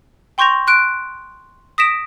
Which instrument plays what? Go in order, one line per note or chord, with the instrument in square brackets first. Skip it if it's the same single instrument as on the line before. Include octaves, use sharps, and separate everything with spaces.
[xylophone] G5 C6 C#6 G6 A#6 F7
C6 F#6 D7
D#6 A#6 B6 D7 E7